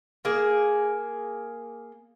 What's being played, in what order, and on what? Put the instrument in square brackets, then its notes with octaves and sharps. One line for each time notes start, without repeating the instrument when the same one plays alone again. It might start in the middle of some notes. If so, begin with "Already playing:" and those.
[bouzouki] A#3 G#4